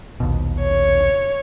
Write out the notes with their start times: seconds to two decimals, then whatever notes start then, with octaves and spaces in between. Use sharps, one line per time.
0.20 A#1 D#2 B2
0.61 C#5